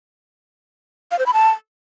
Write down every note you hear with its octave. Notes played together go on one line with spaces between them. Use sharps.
F5
C5
B5
A5